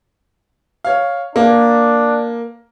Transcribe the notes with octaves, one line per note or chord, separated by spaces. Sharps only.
C#5 F5
A#3 D4